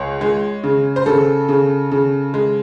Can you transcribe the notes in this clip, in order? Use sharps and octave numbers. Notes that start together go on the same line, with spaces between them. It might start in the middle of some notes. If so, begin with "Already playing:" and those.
Already playing: C#2 C#5
G#3
C#3
C5
C#3 A4
C#3
C#3
G#3